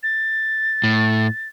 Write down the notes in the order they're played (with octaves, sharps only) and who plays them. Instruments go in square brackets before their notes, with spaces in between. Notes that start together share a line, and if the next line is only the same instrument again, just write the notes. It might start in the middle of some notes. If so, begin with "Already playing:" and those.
[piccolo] A6
[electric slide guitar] A2